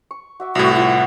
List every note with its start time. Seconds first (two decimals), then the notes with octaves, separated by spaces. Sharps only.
0.11 C#6
0.40 F#4 E5 D6
0.55 C2 A2 B3 E4 F#4
0.76 F4